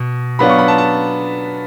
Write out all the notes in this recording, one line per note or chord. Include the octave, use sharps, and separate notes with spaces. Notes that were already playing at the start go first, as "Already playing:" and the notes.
Already playing: B2
F#3 B3 D4 F4 B5
C#6
B5
A5
A5